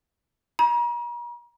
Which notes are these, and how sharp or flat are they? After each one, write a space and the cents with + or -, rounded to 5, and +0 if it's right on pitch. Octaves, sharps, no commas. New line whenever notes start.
A#5 +45